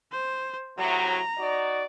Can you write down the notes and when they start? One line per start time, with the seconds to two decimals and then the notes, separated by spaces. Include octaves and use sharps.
0.12 C5
0.78 A2 C3 F#3 A#5
1.38 D#4 F#4 D5